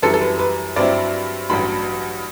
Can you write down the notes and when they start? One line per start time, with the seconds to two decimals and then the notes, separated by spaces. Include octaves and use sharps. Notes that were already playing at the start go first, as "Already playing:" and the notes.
0.03 F#2 E3 G3 A4
0.14 A4
0.21 B4
0.39 B4
0.76 G2 F#3 C4 E4 D5
1.50 A1 G2 F#3 B5